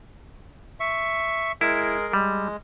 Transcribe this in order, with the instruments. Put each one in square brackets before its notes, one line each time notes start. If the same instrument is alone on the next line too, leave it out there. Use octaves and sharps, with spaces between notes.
[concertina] E5 C#6
[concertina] G#3 G#4 A#4 [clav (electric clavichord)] E4
[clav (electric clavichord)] G3 [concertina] G#3